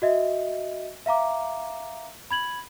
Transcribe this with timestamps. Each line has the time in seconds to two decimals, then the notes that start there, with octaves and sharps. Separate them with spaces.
0.02 F#4 D#5 E5
1.06 E5 F5 A#5 D6
2.31 B5 G#6 F#7